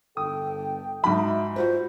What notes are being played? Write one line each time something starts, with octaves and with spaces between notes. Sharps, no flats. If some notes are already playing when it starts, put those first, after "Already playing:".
G1 A4 G5 D#6
G#2 F#3 D#4 E5 B5
G3 F4 F#4 B4 C5 D5